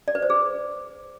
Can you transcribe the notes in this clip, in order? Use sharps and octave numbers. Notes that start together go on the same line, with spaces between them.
D5
B4
C5
G#4